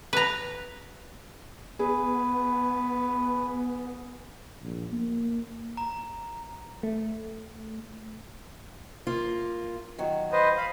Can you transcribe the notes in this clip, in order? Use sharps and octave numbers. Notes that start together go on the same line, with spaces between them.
B4 A#5
B3 G#4 B4
A#1
A#3
A#5
A3
A#3 F4
D#3 F#3
B4 C5 D#5
F5 B5